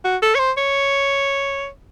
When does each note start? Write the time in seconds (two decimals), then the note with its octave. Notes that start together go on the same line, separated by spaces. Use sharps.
0.04 F#4
0.22 A4
0.35 C#5
0.39 C5
0.57 C#5